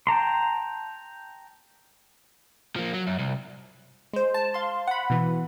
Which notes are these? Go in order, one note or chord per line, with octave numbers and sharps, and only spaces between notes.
G5 A5 A#5 C6
F3 A#3
F#3
F#2
C2
G#3 C5
A5
F5 C6
F#5 B5
B2 E3